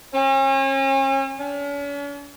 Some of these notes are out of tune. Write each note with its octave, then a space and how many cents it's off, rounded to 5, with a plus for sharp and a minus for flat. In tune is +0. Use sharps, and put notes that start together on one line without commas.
C#4 -40
C#4 +45